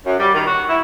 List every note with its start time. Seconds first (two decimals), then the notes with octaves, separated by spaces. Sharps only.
0.06 F#2
0.20 G3
0.34 D#3
0.47 F#4
0.69 E4